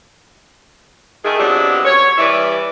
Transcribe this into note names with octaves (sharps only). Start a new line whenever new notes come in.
D#3 A3 G#4
F2 F#3 B3 D4 G4 E5
C#5
E3 G3 B4 D5 E5